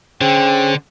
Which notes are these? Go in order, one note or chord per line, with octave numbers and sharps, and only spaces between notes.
D3 C#4 G#4 C5 G5